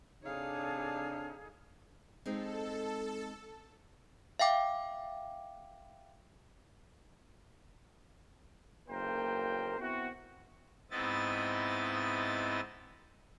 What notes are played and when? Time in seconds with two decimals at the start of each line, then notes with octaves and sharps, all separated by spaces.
0.23 C3 D4 D#4 G#4 A4 C#5 F5
2.26 G#3 C4 D#4 A4
4.39 E5 F5 G5 D6
8.89 F#1 B1 A#3 A#4 C5 G5
9.80 B3 C4 E4 F#4
10.91 G#2 B3 C4 E4 D#5 A6